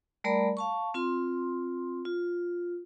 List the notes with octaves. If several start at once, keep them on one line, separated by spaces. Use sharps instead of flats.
G3 A3 A#4 D5 A#5 B5
F5 A5 C#6
C4 F4 C6
F4